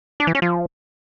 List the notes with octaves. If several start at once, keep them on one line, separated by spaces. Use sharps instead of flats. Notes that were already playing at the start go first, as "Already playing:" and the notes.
D4
E3
C#4
F3